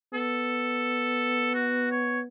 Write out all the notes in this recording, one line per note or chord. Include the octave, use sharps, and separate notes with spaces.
B3 A4
F#4
C#5